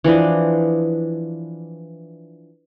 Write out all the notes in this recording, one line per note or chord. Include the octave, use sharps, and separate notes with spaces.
E3 F3 D4 D#5